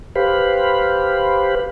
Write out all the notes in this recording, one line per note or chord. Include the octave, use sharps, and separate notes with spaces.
G4 B4 C5 F5 B5